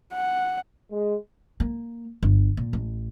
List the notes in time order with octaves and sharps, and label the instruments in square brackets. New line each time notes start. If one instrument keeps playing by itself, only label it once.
[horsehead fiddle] F#5
[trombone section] G#3
[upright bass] A#3
G1
A#2
A1